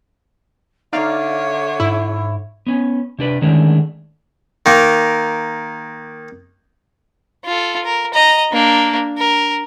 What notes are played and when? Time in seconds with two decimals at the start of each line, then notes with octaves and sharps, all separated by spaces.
0.93 D3 D#4 C#5 D5 E5 F5
1.80 G#2 E4
2.67 B3 C#4
3.19 C3 D4 B4 D5
3.42 D3 D#3 G#3 A3 C#4 D4
4.66 D#3 A#3
7.45 F4 A4
7.85 A#4
8.14 D#5 A#5
8.52 A#3 D4
9.18 A#4